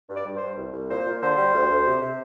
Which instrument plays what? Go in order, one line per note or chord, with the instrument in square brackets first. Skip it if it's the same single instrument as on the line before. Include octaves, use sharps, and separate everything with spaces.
[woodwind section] G2
D5
G2
C5
G2
C2
C2
A#2 C5
A#2
D3 C5
G3
D2
D2
C3
C3